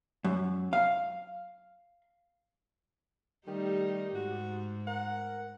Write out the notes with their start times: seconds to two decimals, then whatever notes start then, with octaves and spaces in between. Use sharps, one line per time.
0.24 F#2
0.73 F5
3.47 D#3 G3 A3 D#4 G4
4.15 G#2 F#4
4.87 A#4 F#5